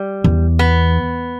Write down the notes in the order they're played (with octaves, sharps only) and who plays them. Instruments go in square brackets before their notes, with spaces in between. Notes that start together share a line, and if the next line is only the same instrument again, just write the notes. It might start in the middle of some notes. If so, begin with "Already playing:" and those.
Already playing: [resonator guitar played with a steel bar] G3
[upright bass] E2
[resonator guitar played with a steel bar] B3